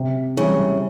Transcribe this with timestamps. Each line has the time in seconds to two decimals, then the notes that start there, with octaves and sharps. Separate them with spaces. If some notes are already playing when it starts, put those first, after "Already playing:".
Already playing: C3
0.37 C#3 E3 G3